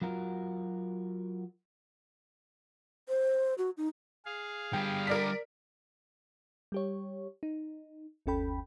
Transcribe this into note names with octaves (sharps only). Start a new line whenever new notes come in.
F#3 F4 F#4 A#4
C5
F#4
D#4
G#4 F5
D3 G3 G5
A#4 D5 B6
G3 G4 C#5
D#4
G1 D#2 C#4 A4 G5 B5